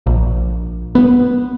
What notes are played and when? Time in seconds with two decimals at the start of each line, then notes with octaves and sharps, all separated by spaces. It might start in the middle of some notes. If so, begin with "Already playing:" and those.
0.06 A#1
0.95 B3